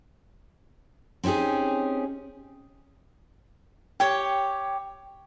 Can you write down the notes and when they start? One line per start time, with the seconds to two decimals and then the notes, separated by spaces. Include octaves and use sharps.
1.24 C4 C#4 D#4 G4 G#4
4.00 G4 C#5 G5